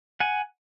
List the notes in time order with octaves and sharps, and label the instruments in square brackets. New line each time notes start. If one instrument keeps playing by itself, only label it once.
[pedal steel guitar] F#5 G#5